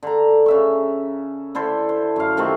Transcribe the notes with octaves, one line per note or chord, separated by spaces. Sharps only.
D3 A#5
C#3 E5 C#6
D3 E4 A4 C5
C5
F#2 F5
C3 D#3 A3 C4